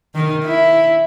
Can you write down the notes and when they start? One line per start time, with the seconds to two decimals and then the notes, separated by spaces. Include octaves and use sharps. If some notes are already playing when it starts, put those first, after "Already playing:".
0.15 D#3
0.45 E4